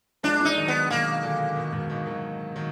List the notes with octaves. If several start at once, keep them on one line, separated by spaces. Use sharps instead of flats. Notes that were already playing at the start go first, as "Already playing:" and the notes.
F3 G#3 D4
F3 G#3 D#4
D#3 F#3
B3
B2 D#3 A#3
A#2 D3
B2 D#3
G#2 B2
B2 D#3
D#3 F#3
D#3 F#3